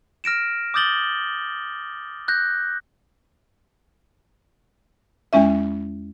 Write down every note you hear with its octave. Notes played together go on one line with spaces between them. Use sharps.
F6 A#6 D7 E7
D6 D#6 G6 A6 F#7 G7
F#6 G6 A#6
E2 G#3 C#4 E5